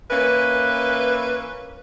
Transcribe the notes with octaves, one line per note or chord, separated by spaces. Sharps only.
E3 A#3 C#4 B4